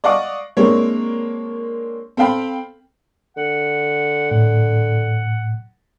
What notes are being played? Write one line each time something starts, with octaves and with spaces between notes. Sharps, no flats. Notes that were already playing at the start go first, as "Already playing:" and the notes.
D5 D#5 F5 F#5 C#6 D6
G#3 A#3 C4 D4 A#4 C#5
C4 A4 F5 G5 B5
D3 F#5
A2 F#5